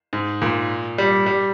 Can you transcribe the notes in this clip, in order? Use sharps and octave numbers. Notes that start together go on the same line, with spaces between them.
G#2
A#2
G3
G3